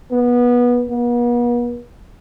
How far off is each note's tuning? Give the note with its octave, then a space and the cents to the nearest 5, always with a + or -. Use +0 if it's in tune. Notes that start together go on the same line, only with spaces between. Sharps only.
B3 -20
B3 -45